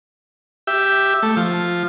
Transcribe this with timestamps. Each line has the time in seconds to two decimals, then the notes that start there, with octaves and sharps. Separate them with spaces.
0.67 G4 E5
1.23 A3
1.37 F3